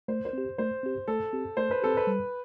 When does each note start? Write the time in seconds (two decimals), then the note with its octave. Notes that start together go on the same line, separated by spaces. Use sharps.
0.08 A3 C5
0.25 C5
0.33 C4 G4
0.58 A3 C5
0.83 C4 G4
1.08 A3 A4
1.33 C4 G4
1.57 A3 C5
1.71 B4
1.82 C4 G4 A4
1.97 B4
2.07 G3